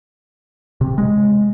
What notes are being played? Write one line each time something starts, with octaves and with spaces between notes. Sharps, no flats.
C3
G#3